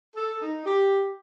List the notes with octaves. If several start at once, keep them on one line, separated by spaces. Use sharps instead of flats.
A4
D#4
G4